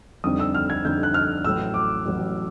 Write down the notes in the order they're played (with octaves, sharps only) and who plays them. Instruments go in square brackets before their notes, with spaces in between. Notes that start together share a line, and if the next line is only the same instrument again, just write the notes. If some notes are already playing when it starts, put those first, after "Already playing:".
[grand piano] F2 D3 G3 C4 D#4 D#6
E6
F6
G#6
F2 D3 G3 C4 D#4 G6
F#6
F6
A1 A2 F#3 E6
D6
A1 A2 F#3